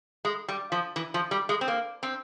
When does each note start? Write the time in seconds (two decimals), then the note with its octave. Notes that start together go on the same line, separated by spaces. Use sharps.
0.25 G#3
0.48 G3
0.72 F3
0.96 E3
1.14 F3
1.31 G3
1.49 G#3
1.61 C4
1.68 A#3
2.03 C4